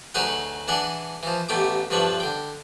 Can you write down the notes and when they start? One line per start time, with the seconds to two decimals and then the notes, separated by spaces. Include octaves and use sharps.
0.14 D2 F#3 D#4 G#4 B4 F#5
0.68 E3 D4 G#4 F#5
1.23 E3 F3
1.49 A1 B2 A3 G4 D6
1.90 B1 G2 F3 D4 B4 C#6
2.20 D3 G5